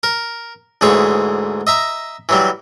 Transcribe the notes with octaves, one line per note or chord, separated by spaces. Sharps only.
A#4
D2 G#2 E3 G#4 C#5
D#5 E5 A#5
E3 F#3 G3